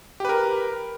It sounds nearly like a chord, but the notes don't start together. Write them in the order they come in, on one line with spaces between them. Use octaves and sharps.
G4 B4 A#4